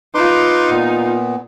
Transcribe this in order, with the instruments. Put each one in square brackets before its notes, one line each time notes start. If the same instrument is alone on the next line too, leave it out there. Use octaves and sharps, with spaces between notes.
[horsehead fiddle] D#4 F4 [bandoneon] B4 C6 D6
[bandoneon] A#2 B3